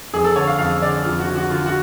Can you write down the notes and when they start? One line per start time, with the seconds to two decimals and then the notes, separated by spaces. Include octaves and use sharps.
0.13 F2 G#4
0.24 A4
0.36 D3 C#5
0.47 F5
0.59 F2 F5
0.82 D3 D5
1.04 F2 F4
1.20 F#4
1.28 D3
1.35 F#4
1.51 D3 F4
1.66 F#4